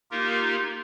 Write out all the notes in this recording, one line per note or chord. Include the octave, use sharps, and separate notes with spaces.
A#3 D#4 F4 G4 A#4